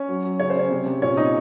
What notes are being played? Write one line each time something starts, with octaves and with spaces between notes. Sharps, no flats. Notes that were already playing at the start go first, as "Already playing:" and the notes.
Already playing: C#4 C#5
F#3
F#3
C#3 C#5
C5
C#3 C#4 C#5
C3
C3
A#2 C#4 C#5
A#2 D#4 D#5